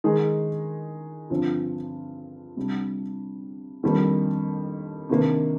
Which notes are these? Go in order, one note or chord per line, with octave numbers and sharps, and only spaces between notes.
D#3 G#3 D#4 G#4
G2 D3 F3 C4 F4
C3 G3 D4
F2 D#3 G3 A#3 D4
C3 D#3 A#3 D4